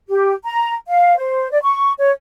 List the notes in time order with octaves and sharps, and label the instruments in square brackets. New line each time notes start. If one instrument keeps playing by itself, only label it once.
[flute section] G4
A#5
F5
C5
D5
C#6
C#5